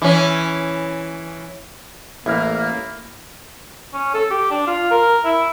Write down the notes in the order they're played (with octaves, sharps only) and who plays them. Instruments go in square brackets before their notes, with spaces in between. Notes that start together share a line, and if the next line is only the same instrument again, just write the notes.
[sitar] E3 C#4
[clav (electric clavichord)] A1 [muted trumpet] A#3 [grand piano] E4 F6
[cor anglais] C#4
A4
G4
D4
F4
A#4
E4